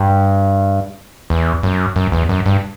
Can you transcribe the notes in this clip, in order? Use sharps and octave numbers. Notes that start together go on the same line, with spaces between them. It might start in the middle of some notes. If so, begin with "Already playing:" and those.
Already playing: G2
E2
F#2
F#2
E2
F#2
G2